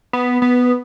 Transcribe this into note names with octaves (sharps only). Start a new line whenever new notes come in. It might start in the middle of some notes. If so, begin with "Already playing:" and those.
B3
B3